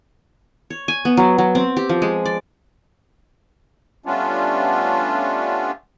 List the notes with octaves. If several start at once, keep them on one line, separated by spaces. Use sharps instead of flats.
C#5
G#5
B3
F#3
F#3
C4
G4
F3
G#3
D5
G3 A3 B3 C#4 D4 F4